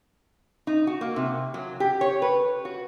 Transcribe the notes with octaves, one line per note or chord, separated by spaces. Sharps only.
D#4
F#4
A#3
C3
F#3
G4
C#5
B4
F#4